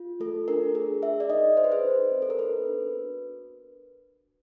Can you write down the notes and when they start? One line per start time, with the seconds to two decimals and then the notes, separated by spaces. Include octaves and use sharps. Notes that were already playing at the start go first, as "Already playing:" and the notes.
Already playing: F4
0.20 A3 A4
0.48 D4 A#4
0.75 G#4 A#4
1.02 G#4 E5
1.20 D5
1.30 D#4 D#5
1.57 G#4 C5
1.64 B4
1.72 C5
1.84 D#4
2.11 C4
2.22 A4
2.30 A#4
2.39 B3 B4
2.66 D4
2.93 F#4